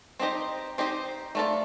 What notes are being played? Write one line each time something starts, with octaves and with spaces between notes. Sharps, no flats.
C4 D#4 G4 C5 D#5
C4 D#4 G4 C5 D#5
A3 D4 F4 A4 D5